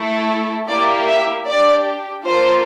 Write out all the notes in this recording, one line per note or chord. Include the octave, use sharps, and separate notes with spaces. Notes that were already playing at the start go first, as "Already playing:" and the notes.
Already playing: A3 E4 A4
A#3 E4 G4 D5
E5
D4 G4 D5
A#3 F4 A4 C5